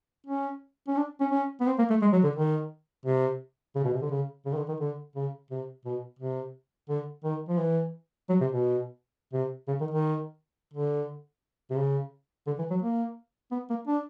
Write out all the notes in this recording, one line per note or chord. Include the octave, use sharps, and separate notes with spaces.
C#4
C#4
D4
C#4
C#4
B3
C4
A#3
A3
G#3
F#3
D3
D#3
C3
C#3
B2
C3
D3
C#3
C#3
D#3
D3
D#3
D3
C#3
C3
B2
C3
D3
D#3
F3
E3
F#3
C3
B2
C3
C#3
D#3
D#3
D3
C3
C#3
D3
E3
F#3
A#3
B3
A#3
D4